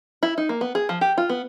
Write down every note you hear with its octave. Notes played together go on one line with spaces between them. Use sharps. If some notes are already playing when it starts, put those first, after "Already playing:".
E4
D#4
A#3
B3
G#4
F3
G4
F4
B3